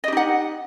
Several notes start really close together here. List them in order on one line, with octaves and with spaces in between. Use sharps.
D#5 G4 D#4 F#5